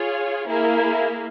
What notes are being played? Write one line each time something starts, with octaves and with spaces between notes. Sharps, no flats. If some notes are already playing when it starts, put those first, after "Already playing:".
Already playing: F4 G#4 C#5
A#3 E4 G#4